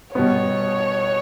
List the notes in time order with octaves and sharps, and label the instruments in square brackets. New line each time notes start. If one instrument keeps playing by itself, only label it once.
[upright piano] B2 G3 B3 [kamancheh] C#5